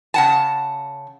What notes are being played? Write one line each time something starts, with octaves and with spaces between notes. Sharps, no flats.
C#3 F#5 A5